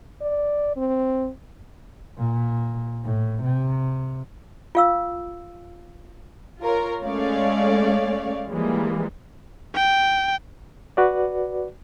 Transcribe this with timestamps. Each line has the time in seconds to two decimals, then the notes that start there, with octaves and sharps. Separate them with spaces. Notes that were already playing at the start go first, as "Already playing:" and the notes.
0.22 D5
0.77 C4
2.18 A#2
3.05 A2
3.43 C3
4.75 F4 F5 E6
6.61 F4 A#4 C#5
7.03 G#3 A3 C#4 C#5 D5 F5
8.48 E3 F3 G3 G#3 A#3
9.75 G5
10.97 F#4 B4 D5